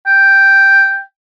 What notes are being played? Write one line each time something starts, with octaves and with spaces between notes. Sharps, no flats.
G5